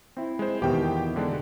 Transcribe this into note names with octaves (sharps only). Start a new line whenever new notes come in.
C4 E4
G#3 C5
E2 B2 D#3 G4 G5
D3 G#3 D4